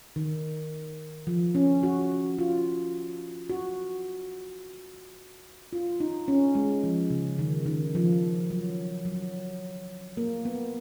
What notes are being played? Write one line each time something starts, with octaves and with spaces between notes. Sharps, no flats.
D#3
F3
C#4
F#4
F4
F#4
F4
D#4
C#4
G#3
F3
C#3
D#3
D#3
F3
F#3
F#3
A#3
B3